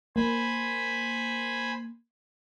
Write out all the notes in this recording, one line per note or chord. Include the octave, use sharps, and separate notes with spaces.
A#3 C5 G#5 B5